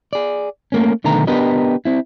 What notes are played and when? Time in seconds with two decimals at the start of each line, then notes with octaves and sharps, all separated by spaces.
0.13 G#4 D5
0.72 A3 A#3 C#4
1.04 B1 D3 D#3 A3 B3 A#5
1.27 B3 D4 G4 A#4 B4 D#5
1.85 C4 E4